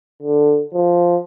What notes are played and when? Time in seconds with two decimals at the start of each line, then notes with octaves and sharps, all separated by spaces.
0.23 D3
0.74 F3